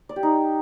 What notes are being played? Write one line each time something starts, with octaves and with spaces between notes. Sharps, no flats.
D5
G4
D#4